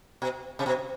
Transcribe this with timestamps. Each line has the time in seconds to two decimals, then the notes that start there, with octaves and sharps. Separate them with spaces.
0.22 B2
0.59 C3
0.66 B2